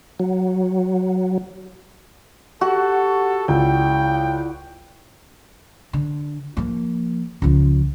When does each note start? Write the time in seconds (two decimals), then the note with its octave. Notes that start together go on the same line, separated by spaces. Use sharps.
0.20 F#3
2.61 F#4 G4 A4 F#5 C#6
3.48 C#2 E4 D5 G5
5.93 D3
6.57 F3 A#3
7.42 C#2 F3